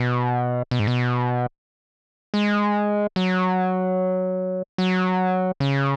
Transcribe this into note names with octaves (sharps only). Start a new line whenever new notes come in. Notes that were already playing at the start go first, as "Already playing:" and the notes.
Already playing: B2
B2
G#2
B2
G#3
F#3
F#3
C#3